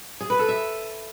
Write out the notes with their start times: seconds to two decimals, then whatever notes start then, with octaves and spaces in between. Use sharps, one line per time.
0.20 G#4
0.30 B4
0.39 A4
0.49 E5